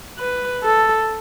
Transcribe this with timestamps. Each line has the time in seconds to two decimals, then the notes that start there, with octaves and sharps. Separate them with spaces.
0.19 B4
0.63 A4